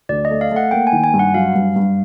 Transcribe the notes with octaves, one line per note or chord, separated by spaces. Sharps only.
D2 D5
D#5
A3
F5
A3
F#5
A#3 G5
G#5
D#3
G#5
G2
F#5
F#3 F5
G2
G2